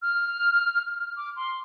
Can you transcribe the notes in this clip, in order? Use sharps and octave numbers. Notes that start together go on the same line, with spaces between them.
F6
D6
C6